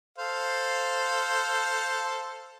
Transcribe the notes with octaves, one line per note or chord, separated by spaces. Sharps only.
A4 C5 F5